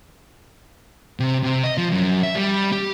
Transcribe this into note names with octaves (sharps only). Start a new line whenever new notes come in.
C3
C3
D#5
F3
F#2
E5
G3
G4